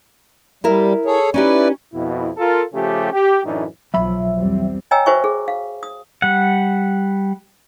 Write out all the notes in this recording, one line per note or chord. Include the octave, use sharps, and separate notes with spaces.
G3 E4 A#4 E5
G#4 A4 C#5
C#4 D#4 E4 G4 B4 D5
F2 B2 E4
F4 A4 A#4
C#3 F3 A3 C#4 G4
G4
F#2 A2 E3 A3 D4 D#4
B1 F3 F#3 E5 B5
E2 G3 C4
C#5 D#5 G5 G#5 A#5 E6
F#4 B4 C5 E5 G#5 C#6
G#4
F5
D#6
G3 F#5